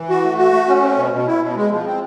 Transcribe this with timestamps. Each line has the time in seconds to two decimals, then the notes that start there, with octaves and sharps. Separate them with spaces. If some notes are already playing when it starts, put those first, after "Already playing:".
Already playing: E3
0.09 F#4
0.24 A3
0.38 F#4
0.52 A3
0.67 C#4
0.82 C4
0.97 B2
1.12 B2
1.27 E4
1.41 B2
1.56 G#3
1.71 F3
1.86 C4